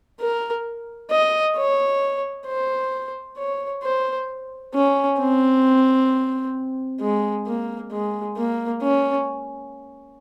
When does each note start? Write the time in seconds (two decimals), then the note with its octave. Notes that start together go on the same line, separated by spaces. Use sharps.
0.20 A#4
1.11 D#5
1.56 C#5
2.47 C5
3.37 C#5
3.83 C5
4.75 C#4
5.20 C4
7.01 G#3
7.47 A#3
7.92 G#3
8.37 A#3
8.83 C#4